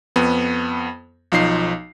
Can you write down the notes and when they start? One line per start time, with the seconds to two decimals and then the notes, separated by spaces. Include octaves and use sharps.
0.16 F2 B3
1.32 B1 F3 D#4 C7